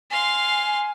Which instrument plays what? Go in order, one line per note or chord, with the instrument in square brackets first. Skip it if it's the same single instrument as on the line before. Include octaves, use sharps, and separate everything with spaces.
[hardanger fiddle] F5 C6 [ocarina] G#5